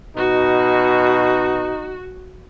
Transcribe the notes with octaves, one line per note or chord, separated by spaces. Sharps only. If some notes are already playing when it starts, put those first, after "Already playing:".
B2 D#4 F#4